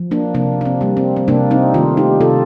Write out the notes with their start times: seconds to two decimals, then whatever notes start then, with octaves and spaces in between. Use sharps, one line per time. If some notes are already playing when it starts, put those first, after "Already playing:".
Already playing: F3
0.11 A#3 D4
0.34 C3 A#3 D4
0.61 D4
0.65 C4
0.81 G3 A#3
0.97 C4
1.16 C4
1.28 C3 A#3 D4
1.51 C4 D#4
1.74 D#3 A3 D4 F4
1.97 D#4 G4
2.21 C3 F4 A4